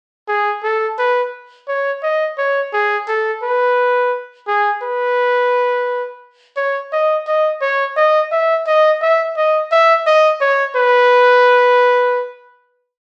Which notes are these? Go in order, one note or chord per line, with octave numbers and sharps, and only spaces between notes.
G#4
A4
B4
C#5
D#5
C#5
G#4
A4
B4
G#4
B4
C#5
D#5
D#5
C#5
D#5
E5
D#5
E5
D#5
E5
D#5
C#5
B4